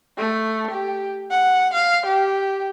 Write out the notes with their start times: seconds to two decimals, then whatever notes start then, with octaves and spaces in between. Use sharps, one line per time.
0.18 A3
0.71 G4
1.31 F#5
1.73 F5
2.06 G4